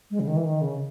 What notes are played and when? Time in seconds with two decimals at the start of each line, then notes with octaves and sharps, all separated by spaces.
0.11 G#3
0.20 C#3
0.27 D#3
0.36 E3
0.45 D#3
0.61 C#3